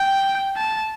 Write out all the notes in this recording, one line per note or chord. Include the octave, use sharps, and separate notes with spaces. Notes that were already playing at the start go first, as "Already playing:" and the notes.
Already playing: G5
A5